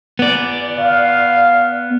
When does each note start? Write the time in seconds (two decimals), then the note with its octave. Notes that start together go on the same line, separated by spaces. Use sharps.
0.19 B3 D5
0.78 F5